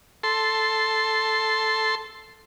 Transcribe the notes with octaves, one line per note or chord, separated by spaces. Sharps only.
A4 C6